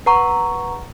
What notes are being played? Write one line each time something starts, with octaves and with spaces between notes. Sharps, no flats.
B4 F#5 A#5 C#6